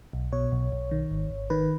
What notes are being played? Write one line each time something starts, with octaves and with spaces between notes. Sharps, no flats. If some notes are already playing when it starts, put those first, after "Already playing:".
B1
B2 C#5
B1
B1
D#3
G#1
G#1
D#3 B4